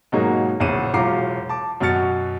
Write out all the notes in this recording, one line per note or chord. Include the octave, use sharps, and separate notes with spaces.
G#2 B2 F#3 A#3 D#4 G#4
A#1 E2 C#3 C#4 D#7 E7
E1 F#3 F4 A#5 D6 C7
A5 D6
F#2 B2 F#4 F6 A6 C#7